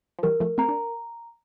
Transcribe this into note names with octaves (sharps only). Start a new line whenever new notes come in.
F3
E3 G3 A#4
F3 A3
A3 C4 A#5
D4